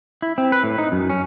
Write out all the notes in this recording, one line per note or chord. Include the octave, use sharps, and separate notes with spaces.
E4
C4
B4
A2
D#4
F#2
C#4